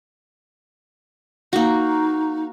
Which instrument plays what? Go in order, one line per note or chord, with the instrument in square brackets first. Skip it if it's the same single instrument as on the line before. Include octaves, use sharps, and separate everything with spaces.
[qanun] A#3 F#4 [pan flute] D#4